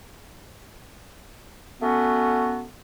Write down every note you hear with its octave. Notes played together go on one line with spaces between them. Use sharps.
A3 B3 C#4 F#4